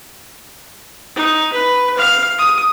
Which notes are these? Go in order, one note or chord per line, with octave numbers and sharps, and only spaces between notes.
D#4
B4
F5
D#6